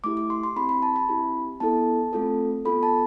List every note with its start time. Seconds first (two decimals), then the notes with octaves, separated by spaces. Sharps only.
0.04 A3 E4 G4 D6
0.17 D6
0.30 C6
0.43 C6
0.56 C4 E4 G4 B5
0.69 B5
0.82 A5
0.96 B5
1.09 C4 E4 G4
1.60 B3 E4 A4 A5
2.13 A3 C4 F4 A4
2.65 B3 F4 A4 B5
2.83 A5